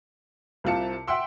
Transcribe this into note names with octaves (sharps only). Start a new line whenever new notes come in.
C2 C3 G3 F4 A5 C#7
E5 F#5 G5 C6 E6